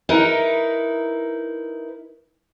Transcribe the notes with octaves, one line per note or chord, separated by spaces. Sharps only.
D#4 E4 A#4 B4